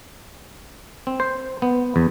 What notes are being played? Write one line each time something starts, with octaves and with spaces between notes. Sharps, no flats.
C4
C5
B3
E2